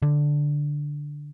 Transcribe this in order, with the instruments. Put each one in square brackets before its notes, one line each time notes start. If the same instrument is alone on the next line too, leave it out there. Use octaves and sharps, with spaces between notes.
[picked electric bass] D3